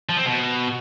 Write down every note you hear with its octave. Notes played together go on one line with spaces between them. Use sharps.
F3
C4
B2